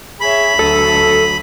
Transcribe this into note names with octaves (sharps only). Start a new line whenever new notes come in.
G#4 C#5 E5 B5
D2 F#3 A4 D#6